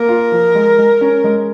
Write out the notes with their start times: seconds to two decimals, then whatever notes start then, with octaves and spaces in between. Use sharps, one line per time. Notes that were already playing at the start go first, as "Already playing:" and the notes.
Already playing: A#3 A#4
0.08 F4
0.32 F3
0.55 G#3
0.78 G#3
1.01 C#4
1.24 G#3